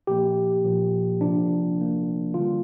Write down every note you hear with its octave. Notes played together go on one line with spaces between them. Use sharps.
A#2 F3 A#3 G4
A#2 F3 A#3
C3 F3 A#3 D4
C3 F3 A#3
D3 G3 A#3 F4